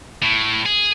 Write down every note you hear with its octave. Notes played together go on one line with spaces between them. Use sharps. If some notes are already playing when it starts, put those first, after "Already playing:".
A2
G#4